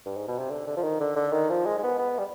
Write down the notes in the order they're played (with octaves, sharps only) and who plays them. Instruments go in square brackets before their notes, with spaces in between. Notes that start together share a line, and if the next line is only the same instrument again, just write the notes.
[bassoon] G2
G#2
B2
C3
D3
D3
F3
D#3
D3
D3
D#3
F3
G#3
G#3
B3
B3
G3